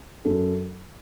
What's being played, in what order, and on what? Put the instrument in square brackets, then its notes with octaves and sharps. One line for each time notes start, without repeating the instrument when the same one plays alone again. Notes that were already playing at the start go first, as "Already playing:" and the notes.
[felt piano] F#2 A4